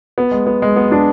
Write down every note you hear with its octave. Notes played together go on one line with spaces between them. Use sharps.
B3
G#3
B3
G#3
B3
D4